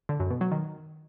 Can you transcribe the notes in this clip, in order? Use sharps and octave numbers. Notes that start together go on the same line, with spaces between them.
D3
F#2
B2
F#3
D#3